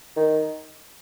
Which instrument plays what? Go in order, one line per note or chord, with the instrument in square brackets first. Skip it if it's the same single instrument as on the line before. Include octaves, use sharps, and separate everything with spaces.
[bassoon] D#3